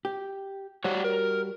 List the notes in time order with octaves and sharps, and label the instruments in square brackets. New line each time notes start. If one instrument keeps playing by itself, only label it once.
[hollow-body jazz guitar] G4
[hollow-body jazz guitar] G3 F#4 [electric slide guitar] C#5 D5 F#5
[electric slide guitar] A#4